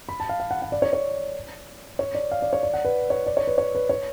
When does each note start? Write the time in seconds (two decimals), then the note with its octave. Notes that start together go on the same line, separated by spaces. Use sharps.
0.09 B5
0.20 A5
0.29 F5
0.40 F5
0.51 F#5
0.62 F#5
0.72 D5
0.82 C#5
0.93 C#5
1.99 C#5
2.15 D5
2.31 F5
2.42 D5
2.53 C#5
2.63 D5
2.74 F#5
2.85 B4
3.10 C#5
3.26 D5
3.37 C#5
3.47 B4
3.58 C#5
3.75 B4
3.89 C#5